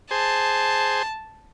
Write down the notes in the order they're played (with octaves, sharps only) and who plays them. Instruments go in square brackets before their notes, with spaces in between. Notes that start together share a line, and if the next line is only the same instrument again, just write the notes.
[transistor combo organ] G#4 C5 [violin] A5